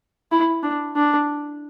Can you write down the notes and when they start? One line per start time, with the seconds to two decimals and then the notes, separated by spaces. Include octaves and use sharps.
0.32 E4
0.63 D4
0.96 D4